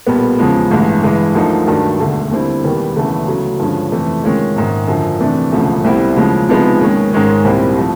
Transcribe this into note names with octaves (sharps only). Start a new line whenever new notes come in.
B1 A#2 G3 B3
E2 C#3 F3 G#3
A1 G2 E3 G#3
G2 E3 G#3
D2 D3 F3 A#3 D#4
G2 D#3 F#3 A3 D4
E1 D2 D3
D#2 D3 G3 C4 E4
E1 D#2 D#3 G3 B3
E1 D2 C#3 E3 A3
D2 C#3 F#3
G2 D3 F3 G#3 C#4
F2 C3 E3 A3
C3 D#3 G#3 C#4 F4
A#1 G#2 D#3
F#2 D3 F3
C3 E3 A3 D4
E1 D2 C#3 F3
C2 B2 G3 C4 E4
D#2 C#3 F3 G#3
C3 F3 G#3 B3 D#4
D#2 D#3 G#3 C#4
G#2 D#3 G#3 C#4
C2 A#2 G3 C4 E4
F3 A3